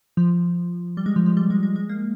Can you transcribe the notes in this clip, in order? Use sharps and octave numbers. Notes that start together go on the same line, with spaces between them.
F3
G3
G#3
F3
F3
G3
G#3
G#3
G#3
A#3